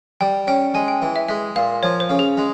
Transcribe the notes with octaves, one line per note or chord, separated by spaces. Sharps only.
G3 G5
C#4 G5
G#3 G#5
G5
E3
E5
G#3 E5
A#2 F5
F3 C#5
C5
C#3
G#4
G#3